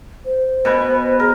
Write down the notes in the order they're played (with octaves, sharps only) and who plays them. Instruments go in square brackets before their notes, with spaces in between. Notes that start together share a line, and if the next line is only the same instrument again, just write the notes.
[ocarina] C5
[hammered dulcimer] B2 B4 G#5
[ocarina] G#4 [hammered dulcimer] A#4